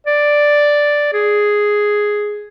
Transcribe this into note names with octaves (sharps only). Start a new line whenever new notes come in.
D5
G#4